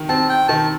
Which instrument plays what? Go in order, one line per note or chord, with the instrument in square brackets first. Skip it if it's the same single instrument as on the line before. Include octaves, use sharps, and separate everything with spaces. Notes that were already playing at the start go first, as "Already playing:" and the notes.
Already playing: [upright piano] D#3
[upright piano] C4 [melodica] A5
[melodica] G5
[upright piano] D#3 [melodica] A5